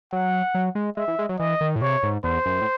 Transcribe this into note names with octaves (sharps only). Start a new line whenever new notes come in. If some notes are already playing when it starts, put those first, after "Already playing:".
F#3 F#5
F#3
G#3
G#3 E5
E3
G#3
F#3
E3 D#5
D#3
A2
C3 C#5
G#2
E2 C5
F#2
A2